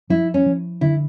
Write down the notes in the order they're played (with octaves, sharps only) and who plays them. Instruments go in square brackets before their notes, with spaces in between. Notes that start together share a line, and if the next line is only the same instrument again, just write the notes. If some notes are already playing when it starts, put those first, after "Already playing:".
[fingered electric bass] F3 [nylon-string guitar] E4
[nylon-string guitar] C#4
[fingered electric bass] F3
[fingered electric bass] D3 [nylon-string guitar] E4